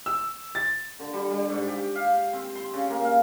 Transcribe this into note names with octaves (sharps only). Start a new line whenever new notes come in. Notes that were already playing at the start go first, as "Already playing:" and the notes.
E6
A6
D3
G3
G3
G#2
G4
F5
C4
C6
C#3
A#3
F5